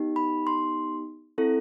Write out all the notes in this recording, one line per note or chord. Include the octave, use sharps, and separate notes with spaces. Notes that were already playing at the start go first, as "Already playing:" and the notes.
Already playing: B3 D#4 G4
B5
C6
C4 E4 A4